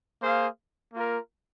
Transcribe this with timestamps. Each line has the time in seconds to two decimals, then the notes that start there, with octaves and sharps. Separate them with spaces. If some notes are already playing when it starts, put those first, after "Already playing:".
0.21 A#3 G#4 C5 F5
0.94 A#3 F4 A#4